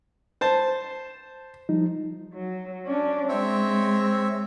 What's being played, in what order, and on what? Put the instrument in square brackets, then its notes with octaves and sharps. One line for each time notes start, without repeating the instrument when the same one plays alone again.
[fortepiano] C5 A5
[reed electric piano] F3 G3 D#4
[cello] F#3
C#4 D4
[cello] G#3 [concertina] C4 C#5 E5